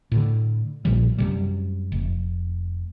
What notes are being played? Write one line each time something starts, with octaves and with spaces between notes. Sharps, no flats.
A2 D3
A#1 A#2 F3 G3
F#2 C3 G3
F1